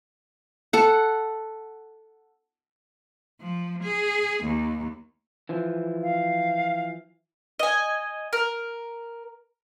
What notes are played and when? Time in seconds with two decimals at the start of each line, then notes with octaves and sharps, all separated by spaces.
0.73 A4 F#5
3.41 F3
3.83 G#4
4.43 D#2
5.49 E3 F3
6.03 F5
7.59 D#5 G#5
8.33 A#4